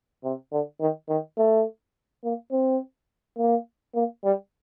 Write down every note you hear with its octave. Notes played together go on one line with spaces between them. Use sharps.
C3
D3
D#3
D#3
A3
A#3
C4
A#3
A#3
G3